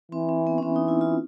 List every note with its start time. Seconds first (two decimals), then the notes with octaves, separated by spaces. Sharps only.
0.12 E3 C4
0.29 C4
0.47 B3
0.58 C#4
0.63 E3 C4
0.76 D#4
0.88 E4
1.01 F4